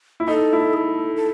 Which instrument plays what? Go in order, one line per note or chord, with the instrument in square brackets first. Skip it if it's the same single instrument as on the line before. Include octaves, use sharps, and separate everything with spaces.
[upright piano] E4
[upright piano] D#4 [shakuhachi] A4
[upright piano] E4
[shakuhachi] G#4
A4
A4